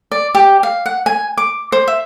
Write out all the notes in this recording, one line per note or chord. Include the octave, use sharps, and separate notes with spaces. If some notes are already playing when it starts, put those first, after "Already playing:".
D5
G4
F5
F#5
G#5
D6
C5
E5